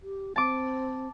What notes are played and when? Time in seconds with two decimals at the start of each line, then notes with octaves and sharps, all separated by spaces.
0.01 G4
0.36 C4 A5 D6